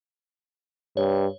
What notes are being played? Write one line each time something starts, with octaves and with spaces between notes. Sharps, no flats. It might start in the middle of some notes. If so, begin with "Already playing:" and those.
G2 C#5